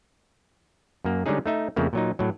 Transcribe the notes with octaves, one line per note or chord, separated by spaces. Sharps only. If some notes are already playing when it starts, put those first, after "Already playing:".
F#2 A#3
D3 G3 G#3 C#4 D#4 G#4
A3 D#4 E5
F2 C#3 A3 A#3
A#2 F#3 D#4
A2 F#3